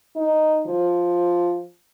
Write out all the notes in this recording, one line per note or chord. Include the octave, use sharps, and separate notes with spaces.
D#4
F3